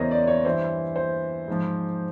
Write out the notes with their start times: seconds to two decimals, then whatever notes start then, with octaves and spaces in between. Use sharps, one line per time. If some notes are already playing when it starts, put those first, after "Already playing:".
Already playing: E2 C#3 E3 A#4 C5 C#5 D#5
0.11 D5
0.27 C#5
0.45 G2 E3 C5
0.96 C5
1.48 G#2 F3